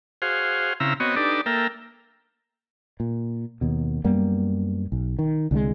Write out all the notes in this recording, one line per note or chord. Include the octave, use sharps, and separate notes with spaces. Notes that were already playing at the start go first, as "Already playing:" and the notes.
F#4 G#4 C5 F5
C#3 C4 E4 E5 F5 A#5
B3 C4 F#4 C#5 D#5
D4 D#4 G4 A4 B4 D5
A#3 A4 A#4 E5 G5
A#2
D#2 B2
F#2 G3 A#3 B3
B1
D#3
C2 D3 F#3 G#3